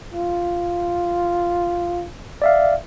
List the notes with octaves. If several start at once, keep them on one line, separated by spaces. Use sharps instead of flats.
F4
D5 E5 F5